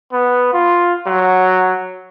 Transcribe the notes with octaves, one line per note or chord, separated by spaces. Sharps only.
B3
F4
F#3